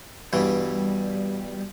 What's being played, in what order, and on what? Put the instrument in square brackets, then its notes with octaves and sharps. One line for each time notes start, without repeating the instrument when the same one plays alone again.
[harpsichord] G2 B2 E3 [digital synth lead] G3